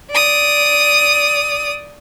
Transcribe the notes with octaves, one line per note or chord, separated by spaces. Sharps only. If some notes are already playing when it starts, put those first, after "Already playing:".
D5 D#6